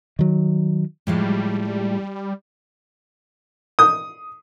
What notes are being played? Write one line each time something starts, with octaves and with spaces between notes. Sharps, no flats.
D#3 F#3
A2 F3 G3 G#3
D#6